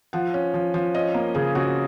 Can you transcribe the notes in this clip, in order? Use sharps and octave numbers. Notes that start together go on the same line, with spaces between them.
F3 F#5
C#4
F3
F3
C#4 D#5
A#3
C#3 G#4
C#3 F#4